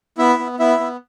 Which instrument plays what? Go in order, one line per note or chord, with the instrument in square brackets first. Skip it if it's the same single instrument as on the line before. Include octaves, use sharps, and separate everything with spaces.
[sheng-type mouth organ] B3 E4 E5
B3
B3 E4 E5
B3